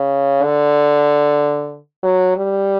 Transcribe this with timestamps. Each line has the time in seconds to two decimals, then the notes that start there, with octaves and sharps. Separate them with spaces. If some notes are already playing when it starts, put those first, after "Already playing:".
Already playing: C#3
0.44 D3
2.03 F#3
2.37 G3